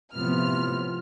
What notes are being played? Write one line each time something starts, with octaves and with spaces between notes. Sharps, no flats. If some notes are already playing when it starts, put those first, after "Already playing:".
A2 C3 F3 B3 F4 F6